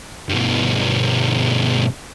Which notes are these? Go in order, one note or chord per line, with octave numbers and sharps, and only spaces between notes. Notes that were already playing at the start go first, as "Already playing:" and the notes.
G2 B2